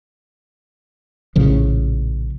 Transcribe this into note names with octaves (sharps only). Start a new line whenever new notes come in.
A#1 A2 C#3 F3